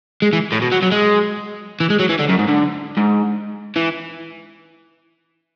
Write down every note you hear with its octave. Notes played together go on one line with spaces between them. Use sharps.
G#3
E3
A2
B2
F#3
F#3
G#3
E3
G#3
F#3
E3
D3
F#2
G#2
D3
G#2
E3